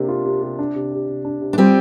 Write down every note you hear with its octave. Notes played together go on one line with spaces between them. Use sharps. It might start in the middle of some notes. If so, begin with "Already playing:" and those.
Already playing: C3 A#3 D4
F4
C3
C3
D4
C3
G4
C3
D4
C3
D4
G3 C4 F4